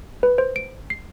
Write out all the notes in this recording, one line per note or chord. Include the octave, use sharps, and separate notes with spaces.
B4
C5
D7
C7